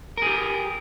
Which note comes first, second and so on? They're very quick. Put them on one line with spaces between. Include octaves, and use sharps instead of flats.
A#4 G#4 G4